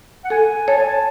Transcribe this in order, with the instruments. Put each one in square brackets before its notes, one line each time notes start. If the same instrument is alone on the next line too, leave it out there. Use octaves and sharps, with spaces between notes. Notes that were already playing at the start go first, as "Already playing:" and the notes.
[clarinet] F#5
[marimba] A4 [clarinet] G#5
[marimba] C#5 [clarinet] A5
[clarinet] G#5
A5